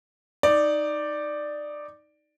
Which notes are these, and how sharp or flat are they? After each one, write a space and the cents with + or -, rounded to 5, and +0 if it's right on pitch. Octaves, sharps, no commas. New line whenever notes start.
D#4 +0 D5 +5